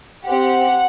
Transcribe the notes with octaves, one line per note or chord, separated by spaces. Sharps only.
C4 G4 F#5